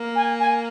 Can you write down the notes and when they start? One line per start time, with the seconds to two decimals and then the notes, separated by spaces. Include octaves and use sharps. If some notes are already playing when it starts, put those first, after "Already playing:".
Already playing: A#3
0.16 G#5
0.40 G#5